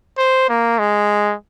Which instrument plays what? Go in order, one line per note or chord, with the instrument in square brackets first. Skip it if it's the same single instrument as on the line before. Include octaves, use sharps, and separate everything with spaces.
[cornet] C5
A#3
G#3